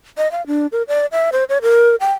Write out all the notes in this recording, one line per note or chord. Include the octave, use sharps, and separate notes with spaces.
D#5
F5
D4
A#4
D5
E5
C5
C#5
A#4
G5